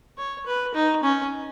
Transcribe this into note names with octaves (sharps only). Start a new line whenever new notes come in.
C#5
B4
D#4
C#4